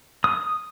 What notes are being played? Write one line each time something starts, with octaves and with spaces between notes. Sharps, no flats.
D#6